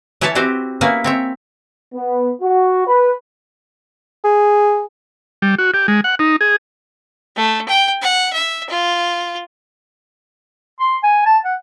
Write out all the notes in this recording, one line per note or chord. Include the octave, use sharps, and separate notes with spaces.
E3 E4 C#5 E5 G#5 A5
C4 F#4 G4 C5
A#3 B3 C#4 E4 B4
C4 C#5 E5
B3
F#4
B4
G#4
G3
F#4
G4
G#3
F#5
D#4
G#4
A3
G5
F#5
E5
F4
C6
G#5
A5
F#5